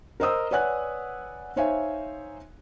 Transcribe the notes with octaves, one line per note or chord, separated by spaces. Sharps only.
A#4 C5 D#5 D#6 E6
B4 C#5 D5 F#5 G#5 F#6
D#4 C5 C#5 E5 F5 G#5